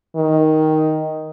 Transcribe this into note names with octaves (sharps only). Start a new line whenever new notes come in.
D#3